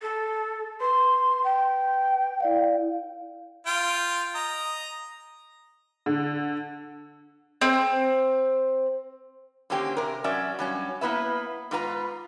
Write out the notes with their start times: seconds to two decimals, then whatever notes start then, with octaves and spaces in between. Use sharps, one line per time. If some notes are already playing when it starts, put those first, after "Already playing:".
0.02 A4
0.80 B4 C6
1.44 G5
2.40 E4 D5 F5
3.67 F4 G5
4.35 D#5 A#5
6.06 D3
7.61 C4
9.70 D3 A#3 C4 C#4 G4
9.97 C3 A#4
10.24 F#3 C#4 D5 E5
10.59 G2 F#3 C#4
11.01 A#3 B3 E4 B4 E5
11.71 G#2 B3 F4 B4 G#5 A#5